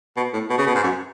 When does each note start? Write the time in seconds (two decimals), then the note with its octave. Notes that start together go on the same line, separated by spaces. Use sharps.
0.17 B2
0.33 A2
0.50 B2
0.58 C#3
0.67 B2
0.75 G#2
0.84 F#2